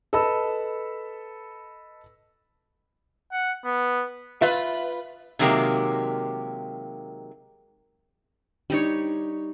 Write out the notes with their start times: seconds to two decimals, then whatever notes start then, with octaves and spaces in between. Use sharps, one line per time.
0.13 A4 B4 D#5 B5 E6
3.32 F#5
3.65 B3
4.42 F4 B4 E5
5.39 C3 D#3 F#3 G#3 A#3 G4
8.70 G3 D4 D#4 C#5